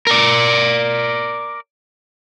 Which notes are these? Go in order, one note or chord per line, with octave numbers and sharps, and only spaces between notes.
A#4 D5